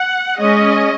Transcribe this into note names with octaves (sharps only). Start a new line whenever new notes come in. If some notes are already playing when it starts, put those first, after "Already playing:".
Already playing: F#5
G#3 C#4 D#5